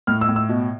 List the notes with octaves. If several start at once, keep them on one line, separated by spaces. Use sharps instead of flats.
A2 F6
E6
A2
E6
B2